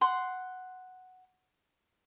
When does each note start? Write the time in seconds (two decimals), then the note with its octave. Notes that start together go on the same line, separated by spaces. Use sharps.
0.01 F#5 C6